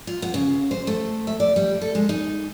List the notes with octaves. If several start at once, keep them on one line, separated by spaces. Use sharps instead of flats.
F4
B3
C#3
C5
A3
E5
D5
G3
A4
G#3
D#4